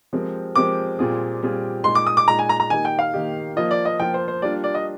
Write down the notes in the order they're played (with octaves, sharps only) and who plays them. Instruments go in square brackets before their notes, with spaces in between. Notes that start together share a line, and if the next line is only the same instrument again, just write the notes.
[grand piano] F3 G#3 C4 G4 A#4
[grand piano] F3 G#3 C4 G4 A#4 [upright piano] D6
[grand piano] A#2 G3 C4 F4 G#4
A#2 G3 C4 F4 G#4
[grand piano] A#2 G#3 D#4 [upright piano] C6
[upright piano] D6
D#6
D6
[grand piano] A#2 G#3 D#4 [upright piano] A#5
[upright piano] G#5
A#5
A#5
[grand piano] D#3 A#3 D#4 G4 [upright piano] G#5
[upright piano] G5
F5
[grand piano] D#3 A#3 D#4 G4
[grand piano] F3 A#3 F4 [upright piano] D#5
[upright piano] D5
D#5
[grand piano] F3 A#3 F4 [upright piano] G5
[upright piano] C5
C5
[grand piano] G3 A#3 D4 F4 [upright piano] D5
[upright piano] D5
D#5